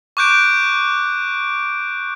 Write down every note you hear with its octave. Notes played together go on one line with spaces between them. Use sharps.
C#6 D6 F#6 G6 D7